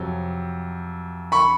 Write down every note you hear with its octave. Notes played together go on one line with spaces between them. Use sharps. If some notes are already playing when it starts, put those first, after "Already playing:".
Already playing: F2 C3 F#3
B5 C#6